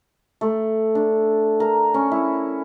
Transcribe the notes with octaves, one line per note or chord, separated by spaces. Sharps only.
A3
D4
A#4
C#4
E4